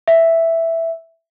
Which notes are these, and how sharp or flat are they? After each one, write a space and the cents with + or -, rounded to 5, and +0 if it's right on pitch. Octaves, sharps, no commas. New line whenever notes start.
E5 +0